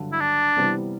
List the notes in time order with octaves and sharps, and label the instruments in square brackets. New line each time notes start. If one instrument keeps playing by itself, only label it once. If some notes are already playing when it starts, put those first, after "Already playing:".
Already playing: [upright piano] G2 D3 F#3
[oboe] E4
D4
[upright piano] C3 E3 G3 B3